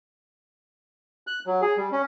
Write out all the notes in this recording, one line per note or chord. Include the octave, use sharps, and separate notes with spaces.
F#6
F#3
G#4
G3
C#4